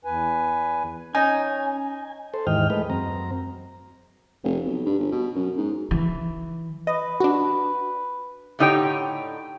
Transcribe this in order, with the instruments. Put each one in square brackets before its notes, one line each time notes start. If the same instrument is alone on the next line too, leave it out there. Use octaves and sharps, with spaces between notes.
[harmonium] E2 B4 G#5
[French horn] C#4 [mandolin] D#4 [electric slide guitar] G#5
[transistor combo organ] A4 C5
D#2 G#2 E3 D#5 G5 F6
G#3 A3 B4 D#5
F#2 C4 A#5
[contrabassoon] F1
B1
G2
G1
B2
F#2
G#2
[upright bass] E3
[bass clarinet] B4 [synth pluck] D#5
[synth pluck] D4 F#4
[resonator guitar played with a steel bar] A2 D3 D#4 G4 C#5 G5